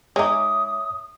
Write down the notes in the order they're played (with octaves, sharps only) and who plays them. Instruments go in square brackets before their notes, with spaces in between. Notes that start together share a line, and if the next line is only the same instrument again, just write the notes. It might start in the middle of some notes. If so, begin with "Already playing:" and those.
[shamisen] G#3 D#4 [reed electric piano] C#5 E5 D6 [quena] D#6